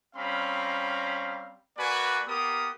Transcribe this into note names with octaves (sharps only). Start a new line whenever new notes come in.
G3 C4 C#4 F5 A#5 B5
A#3 F#4 B4 D5 G#5
A#3 B3 G4 A#4 D#6